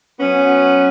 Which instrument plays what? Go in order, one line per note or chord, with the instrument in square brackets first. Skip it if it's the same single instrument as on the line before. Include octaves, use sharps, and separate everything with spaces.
[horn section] F#3 B3 C#4